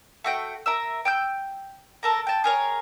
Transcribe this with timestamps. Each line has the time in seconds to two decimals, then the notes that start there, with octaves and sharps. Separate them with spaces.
0.24 A3 F#4 G5
0.66 A#4 E5 E6
1.05 G5 E6 G6
2.03 A4 A#4 A#5
2.27 G5 A5
2.44 G#4 A#4 C#5